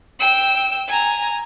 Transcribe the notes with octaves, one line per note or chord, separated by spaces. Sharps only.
G5 E6
G#5 A#5